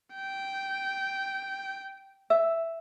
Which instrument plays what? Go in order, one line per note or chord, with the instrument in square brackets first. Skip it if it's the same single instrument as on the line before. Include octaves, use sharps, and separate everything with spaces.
[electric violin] G5
[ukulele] E5